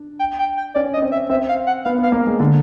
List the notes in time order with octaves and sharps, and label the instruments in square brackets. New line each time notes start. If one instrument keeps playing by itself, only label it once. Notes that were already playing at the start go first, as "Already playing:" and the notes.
Already playing: [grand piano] D4
[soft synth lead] G5
G5
G5
[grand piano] C#4 [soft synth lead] D5
[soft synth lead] D#5
[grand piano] C#4
C4
[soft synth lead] E5
[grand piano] C4 [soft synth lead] E5
[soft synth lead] F5
F#5
[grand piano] B3 [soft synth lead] F5
[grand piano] B3 [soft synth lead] F5
[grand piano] A#3
G#3
D3